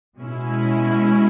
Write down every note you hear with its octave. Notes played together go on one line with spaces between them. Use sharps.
B2 G#3 C#4 E4